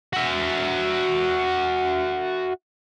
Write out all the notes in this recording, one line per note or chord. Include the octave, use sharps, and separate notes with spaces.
F#4 E5